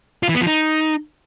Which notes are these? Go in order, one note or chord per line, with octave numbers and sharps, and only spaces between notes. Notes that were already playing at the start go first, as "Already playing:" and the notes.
F4
E3
B3
F3
D#4